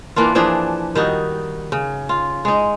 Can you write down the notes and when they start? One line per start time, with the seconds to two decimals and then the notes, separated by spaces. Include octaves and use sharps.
0.16 E3 A#3 D4 F4
0.35 E3 F3 D4 G#4
0.95 D#3 G3 D#4 F#4
1.72 C#3
2.09 F4
2.45 G#3 D#4